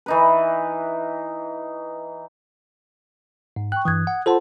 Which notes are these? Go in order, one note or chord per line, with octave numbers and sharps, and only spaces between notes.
E3 D#4 B4
G#2
G5 C#6 F#6
G2 E3 D#6 F#6 G#6
F#5
F4 A4 C5 F#5 A5 C6